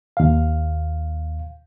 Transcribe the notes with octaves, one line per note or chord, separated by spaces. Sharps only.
D#2 F5